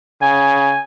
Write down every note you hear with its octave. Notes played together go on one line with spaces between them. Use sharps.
C#3 G#5